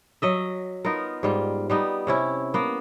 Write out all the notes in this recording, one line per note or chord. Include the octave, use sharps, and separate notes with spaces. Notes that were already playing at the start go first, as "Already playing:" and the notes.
F#3 D#5 E5
B3 D#4 F4 A#4
G#2 G3 F4
G3 B3 D#4
C3 C#4 E4
A#3 B3